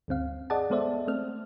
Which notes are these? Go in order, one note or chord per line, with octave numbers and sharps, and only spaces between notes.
D2 G2 C4 F5
G#4 D5 D#5 F#5 A5
G#3 B3 A4 C5 D5 E5
A3 C4 F6